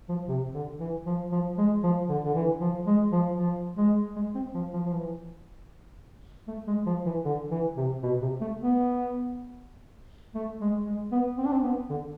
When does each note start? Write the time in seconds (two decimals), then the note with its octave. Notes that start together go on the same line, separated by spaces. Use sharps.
0.09 F3
0.28 C3
0.54 D3
0.80 E3
1.06 F3
1.32 F3
1.58 G#3
1.83 F3
2.09 D3
2.24 D3
2.35 E3
2.60 F3
2.87 G#3
3.12 F3
3.38 F3
3.77 G#3
4.16 G#3
4.35 C4
4.54 F3
4.73 F3
4.85 F3
4.93 E3
6.47 A3
6.67 G#3
6.87 F3
7.06 E3
7.25 D3
7.51 E3
7.77 C3
8.03 B2
8.22 C3
8.41 A3
8.61 B3
10.35 A3
10.61 G#3
10.86 G#3
11.12 B3
11.38 C4
11.45 D4
11.52 C4
11.63 B3
11.90 D3